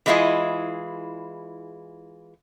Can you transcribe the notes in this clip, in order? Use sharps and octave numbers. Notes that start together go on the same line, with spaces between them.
E3 G#3 E4 F4 G#4 D#5